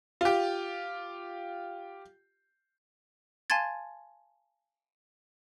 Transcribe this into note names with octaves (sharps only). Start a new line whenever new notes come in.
F4 G4
F5 G#5 A5 C6 G#6 A6